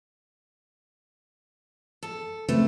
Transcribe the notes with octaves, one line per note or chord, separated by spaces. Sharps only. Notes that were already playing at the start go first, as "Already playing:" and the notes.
A4
C#3 A3 C4 B4